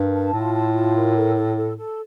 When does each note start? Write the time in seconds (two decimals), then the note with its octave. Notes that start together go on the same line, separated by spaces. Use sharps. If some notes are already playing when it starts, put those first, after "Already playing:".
Already playing: G2 A#4
0.13 A5
0.33 A2 F4
0.54 A5
0.74 F4
0.95 A#4
1.15 A4
1.35 A4
1.57 A4
1.77 A4